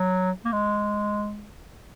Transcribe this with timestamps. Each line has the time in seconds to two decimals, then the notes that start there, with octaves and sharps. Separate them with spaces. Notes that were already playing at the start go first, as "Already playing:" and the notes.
Already playing: F#3
0.45 A#3
0.52 G#3